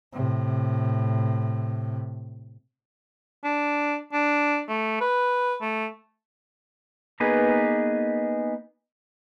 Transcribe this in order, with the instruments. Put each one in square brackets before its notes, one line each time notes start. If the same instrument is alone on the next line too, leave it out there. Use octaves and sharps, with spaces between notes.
[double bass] A2 C3
[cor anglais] D4
D4
A3
B4
A3
[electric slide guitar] A#3 B3 D#4 G#4 B4